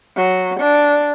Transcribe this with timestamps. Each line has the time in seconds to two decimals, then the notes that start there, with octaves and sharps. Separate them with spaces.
0.17 F#3
0.60 D4